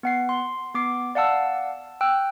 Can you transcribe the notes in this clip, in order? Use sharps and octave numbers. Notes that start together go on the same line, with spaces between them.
B3 F#5 C7
C6
B3 D6 C7
D5 F5 F#5 A5 E6
G5 E6 F#6